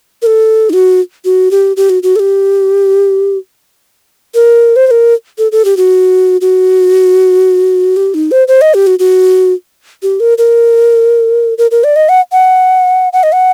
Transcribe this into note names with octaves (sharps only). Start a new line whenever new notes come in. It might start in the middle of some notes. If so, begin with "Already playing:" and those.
A#4
A4
D#4
F#4
F#4
G4
G4
F#4
F#4
A4
G4
A#4
C5
C5
A#4
A4
A4
G4
F#4
F#4
G4
D#4
C5
C5
D#5
G4
F#4
F#4
G4
A#4
A#4
A#4
A#4
D5
D#5
F#5
F#5
F#5
D#5
F#5